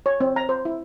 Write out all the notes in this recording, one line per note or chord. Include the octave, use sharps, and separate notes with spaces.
C#5
C4
A#5
C5
E4